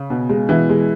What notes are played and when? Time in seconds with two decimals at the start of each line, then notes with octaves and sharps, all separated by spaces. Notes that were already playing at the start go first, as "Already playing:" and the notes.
Already playing: C#3
0.10 B2
0.29 G#3
0.49 B2 E3 E4
0.70 G#3